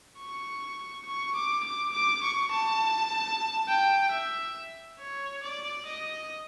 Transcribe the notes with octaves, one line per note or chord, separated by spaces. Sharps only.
C#6
C#6
D6
D6
D6
C#6
A5
G5
E5
C#5
D5
D#5